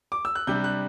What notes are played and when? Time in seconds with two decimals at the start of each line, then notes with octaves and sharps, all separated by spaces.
0.12 D6
0.25 E6
0.35 F#6
0.47 C3 G3 D4 G6
0.64 F#6